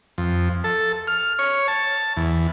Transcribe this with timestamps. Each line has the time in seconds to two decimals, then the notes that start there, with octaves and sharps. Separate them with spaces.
0.18 F2
0.64 A4
1.07 F6
1.39 C#5
1.68 A5
2.17 E2